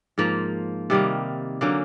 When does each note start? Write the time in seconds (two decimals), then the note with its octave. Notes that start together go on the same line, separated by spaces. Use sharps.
0.18 G#2 F3 A#3
0.90 C3 D#3 G3 A#3
1.61 D3 F#3 A#3 C#4